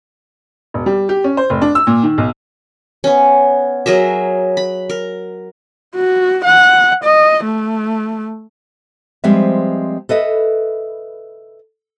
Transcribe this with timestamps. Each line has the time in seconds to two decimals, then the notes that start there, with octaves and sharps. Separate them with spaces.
0.74 E1
0.86 G3
1.09 G4
1.24 C#4
1.37 C5
1.50 F1
1.62 D4
1.75 E6
1.87 A#2
2.03 D#3
2.18 B1
3.04 B3 C#4
3.86 F#3 G#4 A#4 E5
4.57 B5
4.90 A#4
5.96 F#4
6.44 F#5
7.04 D#5
7.44 A3
9.24 F3 G3 G#3 C4 B4 E5
10.09 A4 B4 D#5 E5